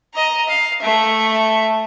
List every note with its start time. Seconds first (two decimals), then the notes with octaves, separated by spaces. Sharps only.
0.15 D#5 A#5
0.49 F5
0.82 A3 E5